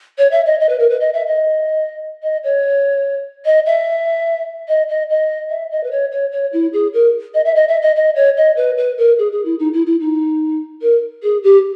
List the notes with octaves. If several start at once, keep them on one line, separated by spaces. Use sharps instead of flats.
C#5
E5
D#5
D#5
B4
A#4
B4
D#5
E5
D#5
D#5
C#5
D#5
E5
D#5
D#5
D#5
E5
D#5
B4
C#5
C#5
C#5
E4
G#4
A#4
D#5
E5
D#5
E5
D#5
D#5
C#5
D#5
B4
B4
A#4
G#4
G#4
E4
D#4
E4
E4
D#4
A#4
G#4
G4